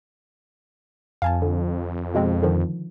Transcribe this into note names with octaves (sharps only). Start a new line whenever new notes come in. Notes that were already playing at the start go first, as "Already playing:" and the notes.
F2 F5 G#5 A5
D3
B2 G#3 C4
D3 D#3 F3